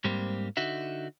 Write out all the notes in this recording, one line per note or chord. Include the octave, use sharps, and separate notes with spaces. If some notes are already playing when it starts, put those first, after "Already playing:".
G#2 G3 A#3 C4
D3 D#4 F#4 E5